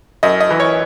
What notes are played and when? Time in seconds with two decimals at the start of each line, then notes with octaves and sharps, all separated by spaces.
0.23 F#2 D#5
0.40 D#5
0.50 E3
0.60 C#5